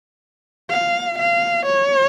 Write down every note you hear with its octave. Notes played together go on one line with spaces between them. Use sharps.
F5
F5
C#5